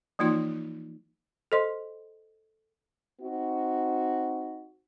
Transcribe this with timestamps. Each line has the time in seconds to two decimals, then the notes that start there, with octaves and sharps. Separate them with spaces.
0.19 E3 F3 A#3 D#4 F4 C6
1.52 A4 C5 D#5 C6
3.21 C4 D#4 F#4